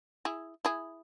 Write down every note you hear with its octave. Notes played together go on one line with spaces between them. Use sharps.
E4 G#4
E4 G#4